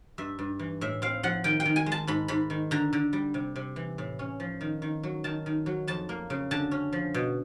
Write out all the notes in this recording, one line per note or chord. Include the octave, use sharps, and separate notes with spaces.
G2 E5
G2
E3
A2 E5
C4 F5
F3 F#5
D#3 G5
G5
D#3
G#5
G#3
A5
G#2 B5
G#2 B5
D#3
D3 A#5
D3
G3
C3
C3
E3
A2
C#4
F3
D#3
D#3
F#3
D#3 A5
D#3
F#3
F2 A5
A#3
C#3
D3 A5
C#4
F3
B2